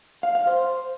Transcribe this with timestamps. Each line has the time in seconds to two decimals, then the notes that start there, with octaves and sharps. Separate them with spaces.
0.23 F5
0.35 F5
0.47 C5